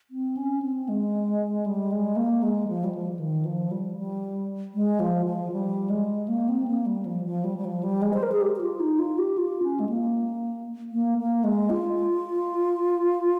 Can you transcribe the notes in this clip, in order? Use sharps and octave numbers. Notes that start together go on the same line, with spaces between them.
C4
C#4
C4
G#3
G3
G#3
A#3
G#3
F3
G3
F3
F3
D#3
F3
G3
G3
G#3
F3
F3
G3
G#3
A#3
C4
A#3
G3
F3
F3
G3
G3
F3
G3
G#3
C5
A#4
G#4
G4
G4
F4
D#4
F4
G4
F4
C#4
G#3
A#3
A#3
A#3
G#3
F4